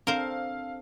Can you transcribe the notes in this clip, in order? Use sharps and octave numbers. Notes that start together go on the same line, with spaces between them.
C4 D4 A4 A#4 C5 F5